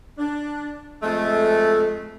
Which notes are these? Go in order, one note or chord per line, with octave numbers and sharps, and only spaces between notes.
D4
F2 G#3 A3